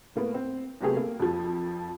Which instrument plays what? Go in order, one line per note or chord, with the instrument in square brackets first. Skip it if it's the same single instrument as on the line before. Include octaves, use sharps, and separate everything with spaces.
[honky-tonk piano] A2 A#3 B3
C4
C3 F#3 A3 B3 G4 G#4
A#3
F2 F3